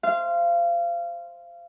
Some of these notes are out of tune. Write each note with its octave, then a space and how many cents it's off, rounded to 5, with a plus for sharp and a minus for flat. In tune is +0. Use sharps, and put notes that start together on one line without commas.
C5 +0 F5 -25